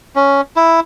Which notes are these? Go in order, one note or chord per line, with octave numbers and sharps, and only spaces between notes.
C#4
E4